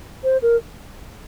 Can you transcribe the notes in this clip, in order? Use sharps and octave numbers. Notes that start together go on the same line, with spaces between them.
C5
A#4